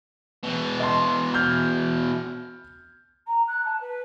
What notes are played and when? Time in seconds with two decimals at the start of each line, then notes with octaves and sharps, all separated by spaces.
0.43 B2 E3
0.80 D#5 A5 C6
1.34 F6 G6 G#6
3.27 A#5
3.47 F#6
3.65 A5
3.80 B4